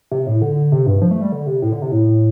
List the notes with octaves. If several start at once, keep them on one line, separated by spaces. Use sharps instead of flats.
C3
A2
D3
C3
G2
F3
A3
G3
D3
C3
A2
D3
C3
A2